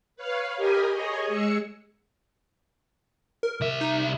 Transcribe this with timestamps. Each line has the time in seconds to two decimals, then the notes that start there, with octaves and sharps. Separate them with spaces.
0.16 B4 C#5 F5
0.57 G4 A#4 D#5 G#5 B5
0.91 G#4 C#5 D#5
1.27 G#3 E6 C#7
3.43 A#4
3.61 C2 E5
3.81 D#4